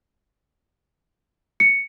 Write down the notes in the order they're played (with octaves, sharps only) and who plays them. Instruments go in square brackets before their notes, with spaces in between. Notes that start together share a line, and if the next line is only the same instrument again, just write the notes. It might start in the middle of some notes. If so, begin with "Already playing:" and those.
[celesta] C#7